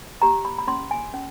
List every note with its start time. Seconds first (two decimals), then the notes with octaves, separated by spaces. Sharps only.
0.22 G4 A#5
0.45 B5
0.59 B5
0.68 C#4 C6
0.91 G#5
1.14 C#4